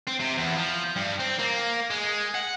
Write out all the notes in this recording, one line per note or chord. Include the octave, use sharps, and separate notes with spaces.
C4
C3
E2
F3
G2
C4
A#3
G#3
F#5